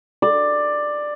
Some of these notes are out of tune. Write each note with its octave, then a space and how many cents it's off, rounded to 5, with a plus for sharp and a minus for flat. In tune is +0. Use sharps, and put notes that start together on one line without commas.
D5 +10